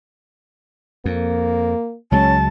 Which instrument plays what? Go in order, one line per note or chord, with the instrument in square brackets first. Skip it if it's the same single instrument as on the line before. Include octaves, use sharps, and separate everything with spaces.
[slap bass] F2 [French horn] A#3
[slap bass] C#2 F#3 G#3 [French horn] C#4 [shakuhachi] A5